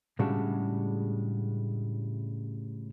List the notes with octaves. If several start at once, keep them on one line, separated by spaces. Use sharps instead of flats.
A2 C#3 G3 G#3 D4 F#4